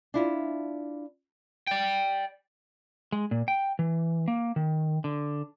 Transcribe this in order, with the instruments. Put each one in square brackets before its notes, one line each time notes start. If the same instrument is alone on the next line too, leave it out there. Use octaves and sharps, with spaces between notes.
[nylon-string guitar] D4 E4 F4
[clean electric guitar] D5 G5
[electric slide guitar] G#3
A#2
G5
E3
A#3
D#3
D3